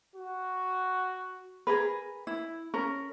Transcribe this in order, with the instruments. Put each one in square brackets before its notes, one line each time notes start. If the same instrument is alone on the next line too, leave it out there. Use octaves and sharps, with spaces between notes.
[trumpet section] F#4
[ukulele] G#4 A#4 B4
E4
C#4 A#4